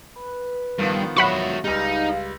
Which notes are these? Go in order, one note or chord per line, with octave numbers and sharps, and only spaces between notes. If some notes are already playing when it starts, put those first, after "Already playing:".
B4
G2 D#3 F3 B3
F#3 F#4 E5 F#5 B5 C#6
C#2 G3 D#4 F5